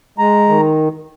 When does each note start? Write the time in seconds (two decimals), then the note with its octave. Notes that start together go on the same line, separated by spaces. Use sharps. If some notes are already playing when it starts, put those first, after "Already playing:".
0.18 G#3 A#5
0.49 D#3